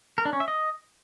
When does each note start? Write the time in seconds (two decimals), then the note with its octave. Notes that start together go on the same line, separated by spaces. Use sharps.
0.18 A#4
0.25 D4
0.33 C#4
0.40 E5
0.48 D#5